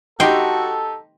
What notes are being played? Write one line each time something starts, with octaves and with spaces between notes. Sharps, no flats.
D#4 F#4 G4 A4 G5 C6